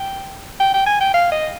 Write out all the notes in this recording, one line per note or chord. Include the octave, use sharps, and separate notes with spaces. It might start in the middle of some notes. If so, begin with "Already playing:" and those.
Already playing: G5
G5
G5
G#5
G5
F5
D#5